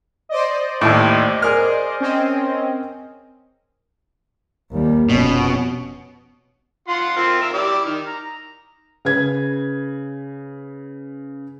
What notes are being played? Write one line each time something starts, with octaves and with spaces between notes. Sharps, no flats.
C5 D5 D#5
A1 D#2 A2
G#4 A#4 F6
C4 C#4 D#5
D#2 G3
F1 B2 C#4
F4 F#5 C6
C4 F4 A#4
A#4 E5
E4 G4 D5
D#3 F6
A#5
C#3 B4 G#6